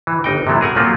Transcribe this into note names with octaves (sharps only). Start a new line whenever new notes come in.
E3
G1 D#4 G5
C3 E3 F#3 A3
G#4 A#4 F#5 G#5
F3 F#3 A3 A#3 C4 F4